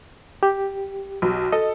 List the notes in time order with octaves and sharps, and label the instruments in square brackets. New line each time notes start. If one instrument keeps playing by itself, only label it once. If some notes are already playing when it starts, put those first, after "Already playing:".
[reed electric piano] G4
[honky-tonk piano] B1
[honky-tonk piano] A4 [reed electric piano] D#5